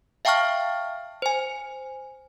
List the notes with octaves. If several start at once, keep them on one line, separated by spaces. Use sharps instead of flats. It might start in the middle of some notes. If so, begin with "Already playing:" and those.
E5 F5 G5 A5 C#6 F6
C5 G#5